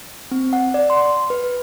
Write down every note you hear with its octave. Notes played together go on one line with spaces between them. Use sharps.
C4
F#5
D5
C6
B4